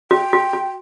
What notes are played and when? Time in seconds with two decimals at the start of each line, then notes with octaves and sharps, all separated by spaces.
0.11 F#4 G5
0.33 F#4
0.53 F#4